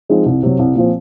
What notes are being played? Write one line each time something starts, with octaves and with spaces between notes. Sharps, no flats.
F3 G#3 C4 D#4
C2
C3 F#3
C2
A#2 F3 C4